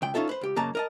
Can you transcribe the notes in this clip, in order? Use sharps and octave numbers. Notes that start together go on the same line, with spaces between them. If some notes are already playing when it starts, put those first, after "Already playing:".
C#2 G5
C#4 D#4 F4 A4 E5
B4 C5
C#2 G4
F#2 C#3 A#3 D#5 A5 A#5
A#4 D#5 A5